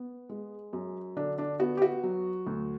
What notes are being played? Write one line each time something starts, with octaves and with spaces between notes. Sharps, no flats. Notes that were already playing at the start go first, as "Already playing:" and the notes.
Already playing: B3
G#3
F#2
D3 D4
D4
B3 F#4
G4
F#4
F#3
D2